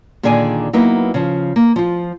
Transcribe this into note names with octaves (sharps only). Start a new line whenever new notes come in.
A#2 D3 D#3 G#4 D5 G#5
F#3 A#3 B3 D#4 E4
C#3 F3
A#3
F3 F4